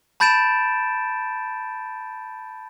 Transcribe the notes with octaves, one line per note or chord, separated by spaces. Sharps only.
A5 B5 G6 A6 D7 E7